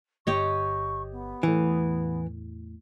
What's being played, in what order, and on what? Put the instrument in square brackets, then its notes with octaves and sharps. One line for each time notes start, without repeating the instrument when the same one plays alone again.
[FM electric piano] G1 [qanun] G4 C#5 D#5 [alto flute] C#6
[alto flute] B3
[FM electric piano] E2 A2 [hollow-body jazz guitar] E3